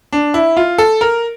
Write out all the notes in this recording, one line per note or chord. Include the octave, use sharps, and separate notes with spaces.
D4
E4
F4
A4
A#4